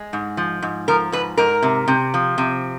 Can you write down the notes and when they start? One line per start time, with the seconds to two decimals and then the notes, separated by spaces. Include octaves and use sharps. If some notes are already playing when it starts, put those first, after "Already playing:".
Already playing: G#3
0.13 G#2
0.37 F3
0.62 G#2
0.88 F3 A#4
1.12 G#2 B4
1.37 G#2 A#4
1.63 C3
1.88 C3
2.14 F3
2.38 C3